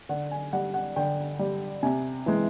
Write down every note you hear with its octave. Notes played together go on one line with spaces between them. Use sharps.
D3 F#5
G#5
G3 F#5
F#5
D3 G5
G3
C3 G#5
E3 G#3